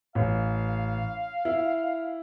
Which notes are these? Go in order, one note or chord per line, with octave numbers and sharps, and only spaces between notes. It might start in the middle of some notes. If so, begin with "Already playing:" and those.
A1 F5
E4